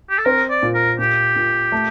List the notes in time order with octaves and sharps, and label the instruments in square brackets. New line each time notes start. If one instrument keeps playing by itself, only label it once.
[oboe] G4
A4
[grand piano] C4 [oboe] A#4
[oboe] D5
[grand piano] A#2
[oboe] A#4
[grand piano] A#2 [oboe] G4
[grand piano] A#2
A3